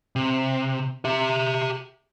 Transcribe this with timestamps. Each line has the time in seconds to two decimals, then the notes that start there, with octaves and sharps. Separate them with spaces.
0.16 C3
1.05 G4 E5